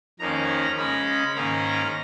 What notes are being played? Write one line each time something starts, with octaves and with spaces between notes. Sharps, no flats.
F2 D#3 A#3 C#4 A#5
C#3 G#3 C#4 B5
B5
G#2 D#3 A#3 C#4 A#5